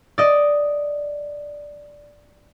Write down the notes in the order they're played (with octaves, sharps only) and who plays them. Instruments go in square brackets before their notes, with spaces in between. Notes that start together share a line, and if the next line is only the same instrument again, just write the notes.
[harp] D5 D#5